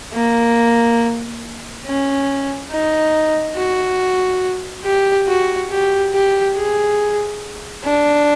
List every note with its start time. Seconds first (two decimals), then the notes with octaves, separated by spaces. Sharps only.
0.14 A#3
1.86 C#4
2.71 D#4
3.57 F#4
4.85 G4
5.28 F#4
5.71 G4
6.14 G4
6.56 G#4
7.85 D4